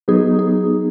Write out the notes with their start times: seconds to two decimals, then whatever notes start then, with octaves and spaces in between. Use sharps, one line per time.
0.08 F#3 B3 D#4 G#4
0.39 G#4